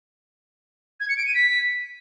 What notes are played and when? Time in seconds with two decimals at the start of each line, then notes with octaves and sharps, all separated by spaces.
1.00 G#6
1.09 C#7
1.17 D7
1.26 D#7
1.35 B6